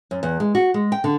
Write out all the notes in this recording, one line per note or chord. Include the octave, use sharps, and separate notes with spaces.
F#2
E2
G#3
F#4
G#3
G5
D3